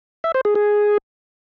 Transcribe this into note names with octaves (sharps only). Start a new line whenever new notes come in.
E5
C5
G#4
G#4